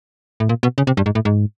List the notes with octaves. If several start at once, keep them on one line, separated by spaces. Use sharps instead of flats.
A2
A#2
B2
C#3
C3
G2
G#2
A2
G#2